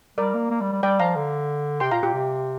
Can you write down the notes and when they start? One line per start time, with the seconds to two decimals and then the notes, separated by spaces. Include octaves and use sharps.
0.17 G3 A#4 D5
0.34 A#3
0.50 A#3
0.61 G3
0.72 G3
0.83 G3 D5 G5
0.99 F3 F5 A#5
1.16 D3
1.80 C3 G5 C6
1.91 A#2 F5 A#5
2.02 A#2 G4
2.13 C3